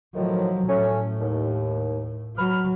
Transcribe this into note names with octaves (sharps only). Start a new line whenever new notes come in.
A2 D#3 F3 F#3
A2 A3 C#4
D#2
F#3 B5 F6